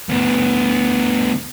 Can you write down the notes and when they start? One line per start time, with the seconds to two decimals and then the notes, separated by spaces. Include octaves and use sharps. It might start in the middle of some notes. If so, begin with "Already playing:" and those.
0.09 D2 B3